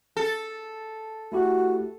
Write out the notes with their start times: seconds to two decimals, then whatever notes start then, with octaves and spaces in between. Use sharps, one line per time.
0.17 A4
1.32 A3 E4 F#4 G4